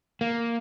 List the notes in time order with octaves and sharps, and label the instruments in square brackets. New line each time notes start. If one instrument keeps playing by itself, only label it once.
[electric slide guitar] A#3